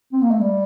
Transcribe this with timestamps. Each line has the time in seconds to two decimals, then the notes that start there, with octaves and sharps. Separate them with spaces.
0.13 C4
0.22 A#3
0.31 A3
0.40 G3